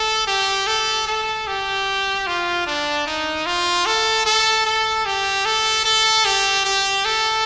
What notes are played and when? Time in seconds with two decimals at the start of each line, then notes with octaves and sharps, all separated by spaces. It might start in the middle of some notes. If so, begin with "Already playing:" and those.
Already playing: A4
0.27 G4
0.67 A4
1.07 A4
1.47 G4
2.27 F4
2.67 D4
3.07 D#4
3.46 F4
3.86 A4
4.26 A4
4.65 A4
5.06 G4
5.45 A4
5.85 A4
6.25 G4
6.65 G4
7.05 A4